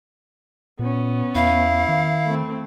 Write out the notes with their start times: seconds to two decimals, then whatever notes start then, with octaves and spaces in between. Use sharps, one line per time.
0.79 A#2 B3 C#4
1.35 E2 E4 F5
1.89 D#3
2.26 A3 C4